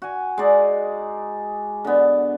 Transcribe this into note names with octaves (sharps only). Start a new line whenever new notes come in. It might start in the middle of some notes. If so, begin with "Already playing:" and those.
F#4 G#5
G#3 D#4 D5
D3 B3